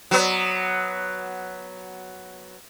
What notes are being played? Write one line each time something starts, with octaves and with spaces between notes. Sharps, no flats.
F#3 B3